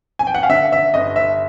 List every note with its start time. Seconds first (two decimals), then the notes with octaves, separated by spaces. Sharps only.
0.19 G#5
0.27 G5
0.35 F#5
0.43 F5
0.49 D3 E5
0.72 E5
0.94 G1 D#5
1.16 E5